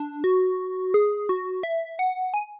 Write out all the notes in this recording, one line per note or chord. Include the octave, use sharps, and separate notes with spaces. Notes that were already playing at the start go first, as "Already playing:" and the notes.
Already playing: D4
F#4
G#4
F#4
E5
F#5
G#5